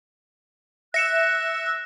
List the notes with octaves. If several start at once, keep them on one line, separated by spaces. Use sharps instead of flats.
E5 F#6 A#6 C#7 E7